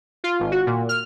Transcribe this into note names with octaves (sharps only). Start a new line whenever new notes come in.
F4
G#1
F#4
A#2
F6